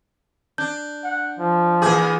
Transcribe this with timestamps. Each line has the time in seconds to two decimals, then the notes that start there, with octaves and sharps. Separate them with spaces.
0.58 D4 G6
1.04 F#5
1.39 F3
1.82 A#2 E3 G#4 D6 G6